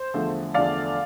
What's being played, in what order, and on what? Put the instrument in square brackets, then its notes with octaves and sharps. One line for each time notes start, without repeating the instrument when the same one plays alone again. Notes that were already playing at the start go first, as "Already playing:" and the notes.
Already playing: [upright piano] C5
E2 D3 F3 A3
E2 D3 F3 A3 D5 F5